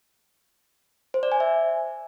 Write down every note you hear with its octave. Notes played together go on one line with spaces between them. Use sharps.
C5
D5
G#5
E5